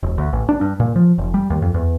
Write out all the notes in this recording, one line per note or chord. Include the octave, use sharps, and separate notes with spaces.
E1
D2
A1
D4
G2
A#2
F3
F1
G3
D#2
F2
E2